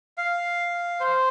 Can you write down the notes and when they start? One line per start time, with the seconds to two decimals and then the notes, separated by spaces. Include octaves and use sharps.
0.18 F5
1.00 C5